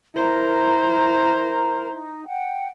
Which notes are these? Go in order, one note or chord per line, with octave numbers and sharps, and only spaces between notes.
E4 A#4 C5 A#5
D#4
F#5 G5